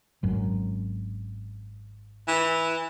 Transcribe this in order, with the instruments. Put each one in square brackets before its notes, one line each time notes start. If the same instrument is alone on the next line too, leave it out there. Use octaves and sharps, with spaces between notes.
[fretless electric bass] G#1 F#2
[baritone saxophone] E3